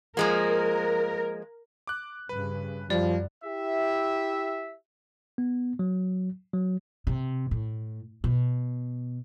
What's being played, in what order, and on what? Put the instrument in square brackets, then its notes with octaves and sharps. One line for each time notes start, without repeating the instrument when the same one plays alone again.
[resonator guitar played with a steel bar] F3 G#3 A#3 [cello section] A#4
[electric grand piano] D6 F#6
[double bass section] G2 C#3 [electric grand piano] B4
[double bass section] F#2 [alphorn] F3 [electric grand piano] G3 [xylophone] D5
[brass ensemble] E4 G4 E5
[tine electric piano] B3
F#3
F#3
[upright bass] C3
A2
B2